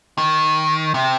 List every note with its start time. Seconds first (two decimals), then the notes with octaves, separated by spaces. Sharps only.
0.18 D#3
0.94 C3